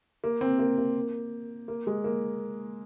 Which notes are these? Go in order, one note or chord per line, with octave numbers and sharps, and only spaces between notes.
A#3
C4
A#3
A#3
A#3
G#3
A#3